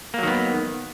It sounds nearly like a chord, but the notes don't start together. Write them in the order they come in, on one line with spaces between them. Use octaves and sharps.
A#3 F#3 D#3 B3